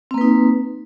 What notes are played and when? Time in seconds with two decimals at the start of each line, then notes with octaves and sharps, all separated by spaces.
0.11 C4
0.14 A#3
0.18 B4
0.21 D#4